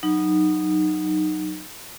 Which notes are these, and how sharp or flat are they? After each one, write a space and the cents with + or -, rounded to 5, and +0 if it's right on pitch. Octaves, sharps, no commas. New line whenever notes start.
F#3 +0 D#4 -15